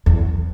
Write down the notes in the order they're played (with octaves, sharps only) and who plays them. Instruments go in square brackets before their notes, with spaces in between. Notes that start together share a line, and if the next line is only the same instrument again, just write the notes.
[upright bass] E2